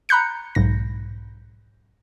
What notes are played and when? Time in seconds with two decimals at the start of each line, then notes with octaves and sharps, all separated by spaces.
0.09 A#5 B5 F#6 G6 C#7
0.55 B1 G#2 A#6